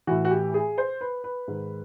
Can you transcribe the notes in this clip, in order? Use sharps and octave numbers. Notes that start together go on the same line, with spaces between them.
A2 E3 F#4
F#4
G4
G#4
C5
B4
B4
G#2 D#3